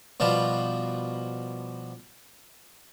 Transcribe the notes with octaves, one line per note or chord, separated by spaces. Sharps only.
B2 F3 G3